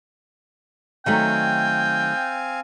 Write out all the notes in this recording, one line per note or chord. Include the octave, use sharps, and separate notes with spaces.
D#3 F#3 A3 C4 F5 G5 G#5